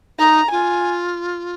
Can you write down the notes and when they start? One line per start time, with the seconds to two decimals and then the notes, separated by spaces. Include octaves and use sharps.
0.18 D#4 A#5
0.51 F4 G#5